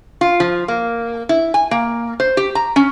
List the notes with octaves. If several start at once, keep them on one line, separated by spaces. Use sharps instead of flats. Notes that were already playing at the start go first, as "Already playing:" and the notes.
F4
F3
A#3
E4
G#5
A#3
C5
G4
A#5
C#4